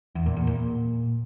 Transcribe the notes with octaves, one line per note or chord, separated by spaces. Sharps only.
E2
A#2
E2
A#2